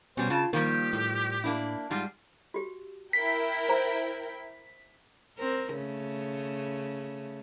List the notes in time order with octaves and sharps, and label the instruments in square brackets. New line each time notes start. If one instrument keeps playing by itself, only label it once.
[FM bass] B2 [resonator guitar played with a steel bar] F#3 G3 C#4 [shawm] C5
[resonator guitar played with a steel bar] C#3 [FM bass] F4 [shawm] A5
[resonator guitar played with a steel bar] D#3 F3 G3 [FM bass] A#3 [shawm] G4
[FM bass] A2
[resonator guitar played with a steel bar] A#3 D4 E4
[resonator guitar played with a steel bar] G#2 G3 [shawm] F4
[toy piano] F#4 G4
[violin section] E4 A#4 G5 [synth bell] B6
[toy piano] C5 A#5
[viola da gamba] C4 A#4
C#3 A3